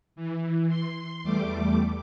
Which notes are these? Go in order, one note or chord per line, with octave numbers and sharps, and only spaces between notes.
E3
C6
E2 G3 A3 D6